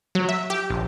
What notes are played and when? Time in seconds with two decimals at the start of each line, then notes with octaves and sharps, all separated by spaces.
0.15 F#3
0.29 E5
0.50 G4
0.70 A#1